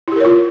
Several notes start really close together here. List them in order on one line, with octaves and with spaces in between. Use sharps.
E4 G4 A#4 C#5 F4